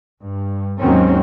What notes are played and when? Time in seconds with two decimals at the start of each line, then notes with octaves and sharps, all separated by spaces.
0.22 G2
0.80 D#2 G#2 D#3 F#3 C4 C#4